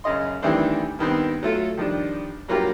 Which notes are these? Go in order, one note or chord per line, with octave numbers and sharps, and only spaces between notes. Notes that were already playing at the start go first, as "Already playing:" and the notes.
F#2 C#3 D#5 C6
D#3 E3 G3 A3 C4 D4
G2 D#3 B3 C4
F#3 A3 F4 A4
D#3 F3 G3 D4
G2 F#3 A#3 F4 G4